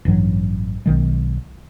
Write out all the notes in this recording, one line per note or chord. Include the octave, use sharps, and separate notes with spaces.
A1 G2 E3 F#3
B1 D#3 G#3